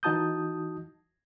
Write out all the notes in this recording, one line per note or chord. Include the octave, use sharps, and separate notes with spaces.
E3 D#4 F#4 A5 D#6 G6